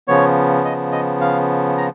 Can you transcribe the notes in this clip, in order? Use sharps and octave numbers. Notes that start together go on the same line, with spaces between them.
C#3 F3 B3 C#5
D#5
D#5
F5
A#5